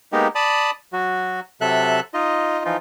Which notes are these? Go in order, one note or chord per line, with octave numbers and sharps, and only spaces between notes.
G#3 A#3 B3 D#4 G4
D5 A5 B5 D#6
F#3 F#4
C3 F#3 A4 E5 F#6
D#4 F4 D#5
E3 F3 D#4 F4